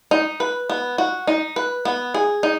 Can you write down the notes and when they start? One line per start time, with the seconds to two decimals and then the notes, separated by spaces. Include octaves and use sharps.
0.11 D#4
0.40 B4
0.70 B3
0.98 F#4
1.27 D#4
1.56 B4
1.85 B3
2.14 G#4
2.43 D#4